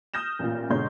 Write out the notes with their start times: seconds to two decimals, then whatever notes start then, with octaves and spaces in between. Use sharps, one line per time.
0.14 D#6 F6 G6 A#6 E7
0.39 A1 A#2 F4
0.70 G#2 B2 D3 C#5 C6 G6